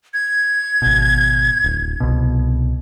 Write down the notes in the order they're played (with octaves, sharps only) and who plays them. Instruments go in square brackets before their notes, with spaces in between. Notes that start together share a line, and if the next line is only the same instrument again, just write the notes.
[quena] G#6
[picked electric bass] G#1 B2
D1
C2 B2